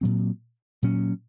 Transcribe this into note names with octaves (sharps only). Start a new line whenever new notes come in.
A#2 F#3 C4
A#2 F#3 C#4